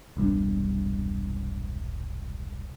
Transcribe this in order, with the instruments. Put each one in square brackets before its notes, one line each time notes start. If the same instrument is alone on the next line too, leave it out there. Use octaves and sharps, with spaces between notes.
[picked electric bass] E1 C2 G2 D4